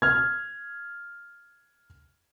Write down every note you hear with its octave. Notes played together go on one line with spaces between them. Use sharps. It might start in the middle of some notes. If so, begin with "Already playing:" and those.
F6 G#6